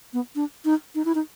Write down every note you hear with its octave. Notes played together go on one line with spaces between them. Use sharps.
B3
D4
D#4
D#4
E4
D#4